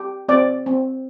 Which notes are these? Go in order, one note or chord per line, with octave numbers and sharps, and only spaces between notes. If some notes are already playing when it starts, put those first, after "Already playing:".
Already playing: G4
C4 D5
C4